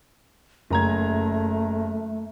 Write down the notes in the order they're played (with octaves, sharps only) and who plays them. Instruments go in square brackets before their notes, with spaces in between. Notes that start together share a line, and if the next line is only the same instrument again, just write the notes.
[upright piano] F#1 A#5 G#6 [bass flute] A3